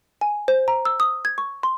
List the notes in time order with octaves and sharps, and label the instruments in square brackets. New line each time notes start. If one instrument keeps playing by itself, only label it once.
[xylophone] G#5
C5
A#5
E6
D#6
G#6
C#6
C6